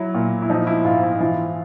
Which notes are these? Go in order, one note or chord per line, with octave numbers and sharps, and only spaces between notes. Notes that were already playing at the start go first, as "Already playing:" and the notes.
Already playing: F#3 E4
A#2
E4
F3 D#4
E4
G#2 F4
E4
E3 F4